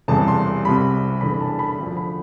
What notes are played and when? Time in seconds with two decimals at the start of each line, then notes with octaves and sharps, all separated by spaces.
0.08 E1 E2 C3 G3 A5
0.28 C6
0.65 C2 C3 G3 B5
1.21 E1 E2 D3 B5
1.41 A5
1.59 B5
1.78 D2 D3 F3
1.97 B5